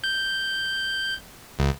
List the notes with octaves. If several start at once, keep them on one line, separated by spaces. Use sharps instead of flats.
G6
C#2